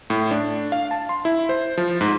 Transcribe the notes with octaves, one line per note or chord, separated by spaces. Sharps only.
A2
D4
F5
A5
C6
E4
C5
F3
G#2